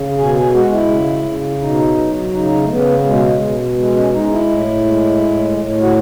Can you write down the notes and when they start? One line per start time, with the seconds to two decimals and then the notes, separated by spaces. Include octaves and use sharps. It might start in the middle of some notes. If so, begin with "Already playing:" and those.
Already playing: C#3
0.18 B2 G#4
0.35 G#4
0.54 G#3 F#4
0.72 E4
0.89 C#3
1.26 C#3
1.61 B2 D#4
1.98 F#3
2.33 C#3 D#4
2.63 A3
2.69 C#3 B3
3.05 B2 G#3
3.41 B2
3.78 G#3
3.96 C#4
4.13 G#3 D#4
4.31 E4
4.49 A2
4.85 G#3
5.22 A2
5.58 A2
5.82 F#4